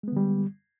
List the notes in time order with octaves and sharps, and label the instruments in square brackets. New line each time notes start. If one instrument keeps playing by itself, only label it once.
[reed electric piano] G#3
B3
D3
G3